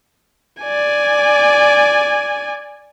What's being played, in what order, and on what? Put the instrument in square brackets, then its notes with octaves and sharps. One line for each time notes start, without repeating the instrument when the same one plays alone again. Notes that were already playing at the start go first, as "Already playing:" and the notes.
[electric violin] D5 G#5